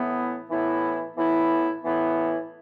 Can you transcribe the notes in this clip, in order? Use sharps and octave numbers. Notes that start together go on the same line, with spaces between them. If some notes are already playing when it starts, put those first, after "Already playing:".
Already playing: A2 E3 B3 E4
A2 E3 B3 E4
A2 E3 B3 E4
A2 E3 B3 E4